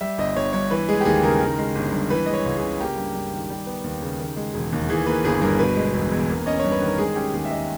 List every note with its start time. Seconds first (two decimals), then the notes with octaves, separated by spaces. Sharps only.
0.01 G3 E5
0.18 G1 D#5
0.36 G1 C#5
0.53 G2 C#5
0.70 E3 B4
0.88 G#3 G#4
1.01 G4
1.05 D#2 G#4
1.23 C#3 A#4
1.40 D#3
1.58 G#3
1.75 G1
1.93 G2
2.10 E3 B4
2.26 G#3 D#5
2.33 C#5
2.46 C#2
2.57 G#4
2.63 C#3
2.80 A#3 G4
2.97 G2
3.15 G2
3.33 D#3
3.50 G3
3.67 B3
3.84 D#2
4.02 C#3
4.20 D#3
4.36 G#3
4.54 E1
4.72 D#2
4.89 E3 G#4
5.06 A#3 B4
5.24 G1 G#4
5.42 G2 A#4
5.59 B2 B4
5.77 G#3
5.93 E1
6.12 E2
6.29 A#3
6.46 C#4 D#5
6.59 G2 C#5
6.72 B4
6.81 D#3 A#4
6.98 G#3 G#4
7.15 C#4 G4
7.33 D#2 G#4
7.45 E5
7.51 D#3 D#5